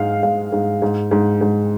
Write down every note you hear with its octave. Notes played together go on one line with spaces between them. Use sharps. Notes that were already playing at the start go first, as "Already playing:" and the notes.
Already playing: G#2 G#3 F5
G#2 F5
G#2
G#2
G#2
G#2